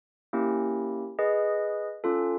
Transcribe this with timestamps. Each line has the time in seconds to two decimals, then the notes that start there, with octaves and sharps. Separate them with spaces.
0.33 A#3 C#4 E4 G4
1.19 G#4 B4 D#5
2.04 C#4 F4 A4